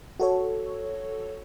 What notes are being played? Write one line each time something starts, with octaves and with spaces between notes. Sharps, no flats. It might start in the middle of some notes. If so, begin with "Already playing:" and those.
F#4 A4 C#5